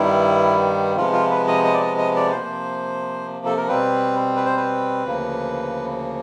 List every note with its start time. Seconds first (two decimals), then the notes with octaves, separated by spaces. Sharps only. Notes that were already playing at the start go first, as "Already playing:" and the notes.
Already playing: G2 D#3 G3 B3 E4
0.96 C3 F3 G#3 B3 F4
1.13 F4
1.30 B4
1.48 D#5
1.64 D#5
1.73 D5
1.81 D#5
1.98 D#5
2.16 D5
2.32 C3 F3 A#3 C5
3.46 A4
3.57 A#4
3.68 B2 G3 C4 B4
4.36 B4
4.46 C5
4.57 B4
5.04 D2 C#3 F3 A#3